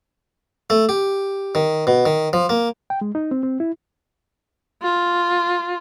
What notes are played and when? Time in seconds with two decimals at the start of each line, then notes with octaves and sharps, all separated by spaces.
0.70 A3
0.89 G4
1.55 D#3
1.87 B2
2.06 D#3
2.33 F3
2.49 A#3
2.90 G5
3.01 G#3
3.15 D#4
3.31 C4
3.43 C4
3.60 E4
4.83 F4